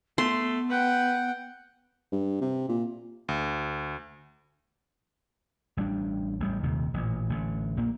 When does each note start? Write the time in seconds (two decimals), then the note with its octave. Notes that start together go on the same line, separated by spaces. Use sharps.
0.18 A3 B3 C6
0.70 B4 F#5 G5
2.12 G2
2.41 C3
2.69 A#2
3.29 D2
5.77 A1 G3 D4
6.40 A1 G3
6.63 D#1 D#2 C3
6.94 A1 A#2
7.30 A1 D3
7.77 A#1 A#2 A#3